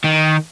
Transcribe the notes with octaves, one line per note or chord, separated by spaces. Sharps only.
D#3